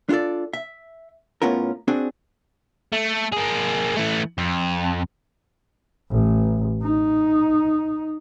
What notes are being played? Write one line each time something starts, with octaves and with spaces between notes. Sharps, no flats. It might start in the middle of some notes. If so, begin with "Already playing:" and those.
D4 F4 F#4 A4 D5
E5
A2 B3 C#4 F4 A#4
C4 D4 F#4 G#4
A3
A#3 G#4
E3 A3
F2
A1
D#4